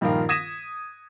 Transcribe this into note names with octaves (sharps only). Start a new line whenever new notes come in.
A#1 G2 D#3 F3 F4 A#4
D#6 G#6 A#6 B6 D#7 E7